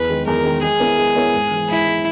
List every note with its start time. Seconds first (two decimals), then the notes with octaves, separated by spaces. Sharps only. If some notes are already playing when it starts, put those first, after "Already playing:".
Already playing: E2 B4
0.09 D#3 G#3
0.26 E2 A#4
0.44 D#3 G#3
0.63 G#3 G#4
0.80 B3 E4 A#4 C#5
0.98 G#3
1.15 B3 E4 A#4 C#5
1.34 G#2
1.51 E3 G#3
1.69 G#2 E4
1.87 E3 G#3